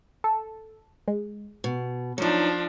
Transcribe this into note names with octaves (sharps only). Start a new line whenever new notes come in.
A4
G#3
B2
F3 F#3 D4 D#4